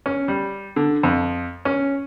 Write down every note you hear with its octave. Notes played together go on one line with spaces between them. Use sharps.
C#4
G3
D3
F2
C#4